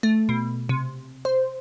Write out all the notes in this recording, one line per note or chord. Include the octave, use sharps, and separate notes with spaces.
A3
B2
C3
C5